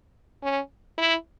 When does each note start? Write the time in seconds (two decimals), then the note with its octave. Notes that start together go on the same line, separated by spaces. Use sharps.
0.43 C#4
0.98 E4